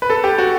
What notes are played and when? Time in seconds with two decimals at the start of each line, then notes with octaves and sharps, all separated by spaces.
0.02 B4
0.10 A4
0.24 G4
0.38 F#4